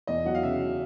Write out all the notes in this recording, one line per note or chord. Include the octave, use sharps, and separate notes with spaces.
E2 D#5
F#3 F#5
F5
C#3 E5